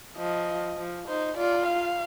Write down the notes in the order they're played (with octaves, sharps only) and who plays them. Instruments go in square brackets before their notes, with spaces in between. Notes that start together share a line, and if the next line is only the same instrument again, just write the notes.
[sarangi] F3 [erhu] D#5
[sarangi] F3
[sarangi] D#4 [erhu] C5
[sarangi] F4 [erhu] D5
[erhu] F5